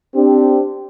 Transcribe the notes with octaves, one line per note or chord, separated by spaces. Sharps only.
C4 D4 G4